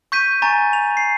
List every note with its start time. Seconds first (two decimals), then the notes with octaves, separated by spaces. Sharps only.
0.12 C#6 G6 B6 D#7
0.42 G#5 A#5 C#6 A6
0.73 F7
0.97 C7